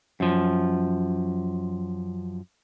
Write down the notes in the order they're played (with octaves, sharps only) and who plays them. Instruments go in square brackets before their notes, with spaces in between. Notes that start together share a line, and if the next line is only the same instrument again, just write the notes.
[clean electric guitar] F#2 F3